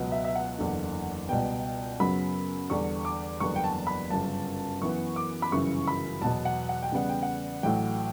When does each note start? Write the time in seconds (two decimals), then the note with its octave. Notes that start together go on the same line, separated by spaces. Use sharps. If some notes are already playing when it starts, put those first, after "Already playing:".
Already playing: C#2 B2 F#3 B3
0.12 E5
0.25 E5
0.35 F#5
0.59 F#1 E2 D3
1.29 C#2 B2 G3 B3 G5
2.00 F#2 C#3 F#3 B3 B5
2.70 E2 D3 G3 C#6
3.05 D6
3.40 F#1 E2 D3 G3 B3 C#6
3.56 G5
3.64 A5
3.87 B5
4.10 G1 F#2 C#3 A5
4.81 F#2 E3 B3 C#6
5.16 D6
5.42 B5
5.51 G1 F#2 C#3 E3 C#6
5.88 B5
6.22 E2 B2 F#3 B3 A5
6.45 F#5
6.69 F#5
6.83 G5
6.92 E2 C#3 G3 B3 F#5
7.09 G5
7.23 F#5
7.63 A1 A2 F#3 G5